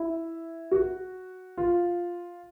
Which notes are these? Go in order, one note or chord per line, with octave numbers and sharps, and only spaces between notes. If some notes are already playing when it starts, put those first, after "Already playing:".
Already playing: E4
F#4
F4